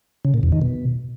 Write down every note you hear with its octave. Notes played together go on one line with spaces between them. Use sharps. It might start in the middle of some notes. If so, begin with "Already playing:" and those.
C#3
A#2
E2
D#3
B2